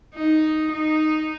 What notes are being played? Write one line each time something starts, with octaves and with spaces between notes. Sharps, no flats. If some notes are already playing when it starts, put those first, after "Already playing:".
D#4
D#4